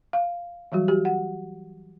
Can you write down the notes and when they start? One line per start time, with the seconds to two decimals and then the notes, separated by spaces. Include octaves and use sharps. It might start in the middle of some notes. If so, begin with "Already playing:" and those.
0.13 F5
0.72 E3 F#3 G3 F#4
0.88 F#4 G4
1.05 F#5